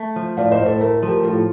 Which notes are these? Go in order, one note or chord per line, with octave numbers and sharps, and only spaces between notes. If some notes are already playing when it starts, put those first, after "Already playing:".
Already playing: A3
F3
A2 D5 F5
C5 D#5
A2
A4 C5
A3 A#4
A4
F3 G4 A#4
A2 F4 A4